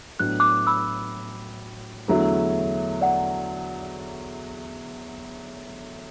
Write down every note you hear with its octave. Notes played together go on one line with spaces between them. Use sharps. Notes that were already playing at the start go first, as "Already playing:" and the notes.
A2 F#3 B3 D4 F#6
D6 F#6
B5 E6
E2 D3 F#3 A3 E4
D5 F#5